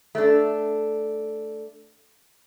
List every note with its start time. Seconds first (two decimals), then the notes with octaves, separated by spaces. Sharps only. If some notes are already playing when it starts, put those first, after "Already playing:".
0.15 A3 D4